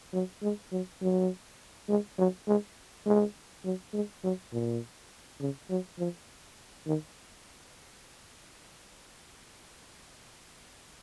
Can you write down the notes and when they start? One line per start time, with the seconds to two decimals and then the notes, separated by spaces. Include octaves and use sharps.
0.13 F#3
0.43 G#3
0.72 F#3
1.02 F#3
1.89 G#3
2.18 F#3
2.48 G#3
3.06 G#3
3.65 F#3
3.94 G#3
4.24 F#3
4.52 A#2
5.40 C#3
5.70 F#3
5.99 F3
6.87 D#3